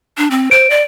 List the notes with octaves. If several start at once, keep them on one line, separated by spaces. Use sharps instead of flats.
D4
C4
C5 D7
D5